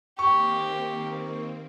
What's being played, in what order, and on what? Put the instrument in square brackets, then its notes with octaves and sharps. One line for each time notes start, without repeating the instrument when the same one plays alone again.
[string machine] D#3 A#3 C4 [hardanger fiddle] G4 [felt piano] C#6